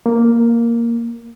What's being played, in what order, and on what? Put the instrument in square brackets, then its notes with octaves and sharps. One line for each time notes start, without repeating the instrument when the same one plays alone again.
[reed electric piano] A#3